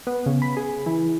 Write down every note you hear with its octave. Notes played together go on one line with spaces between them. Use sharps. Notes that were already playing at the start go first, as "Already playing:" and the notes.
B3
C#3
B5
G#4
E3